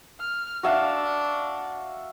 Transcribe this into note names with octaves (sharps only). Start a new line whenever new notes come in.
F6
D4 F#4 E5 F5